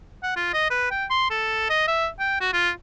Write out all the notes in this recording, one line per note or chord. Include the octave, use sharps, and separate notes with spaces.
F#5
F4
D#5
B4
G5
C6
A4
D#5
E5
G5
F#4
F4